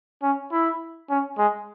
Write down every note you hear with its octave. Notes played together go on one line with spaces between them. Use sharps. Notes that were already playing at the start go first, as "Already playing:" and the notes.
C#4
E4
C#4
G#3